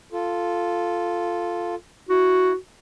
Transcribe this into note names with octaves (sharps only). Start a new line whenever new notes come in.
F4 A4
E4 F#4